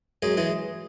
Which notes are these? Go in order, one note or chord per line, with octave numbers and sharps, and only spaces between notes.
F#2 G#3 G#4
E3 G#3 G#4